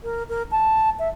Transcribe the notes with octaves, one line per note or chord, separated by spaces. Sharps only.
A#4
A#4
A5
E5